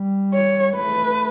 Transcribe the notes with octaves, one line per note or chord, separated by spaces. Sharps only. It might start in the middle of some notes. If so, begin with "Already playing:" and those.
Already playing: G3
C#5
A3 B4